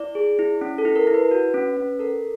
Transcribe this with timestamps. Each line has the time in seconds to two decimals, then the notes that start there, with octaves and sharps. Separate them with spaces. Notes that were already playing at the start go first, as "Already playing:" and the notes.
Already playing: E4 D5
0.15 G#4
0.39 E4
0.61 C#4
0.78 A4
0.85 E4
0.96 A#4
1.07 E4
1.14 B4
1.31 F#4
1.54 C#4
1.77 C#4
1.99 A4 A#4